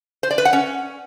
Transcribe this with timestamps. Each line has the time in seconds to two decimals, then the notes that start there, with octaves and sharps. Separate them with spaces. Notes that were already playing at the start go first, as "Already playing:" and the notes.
0.23 C5
0.31 D5
0.38 B4
0.45 F#5
0.53 C#4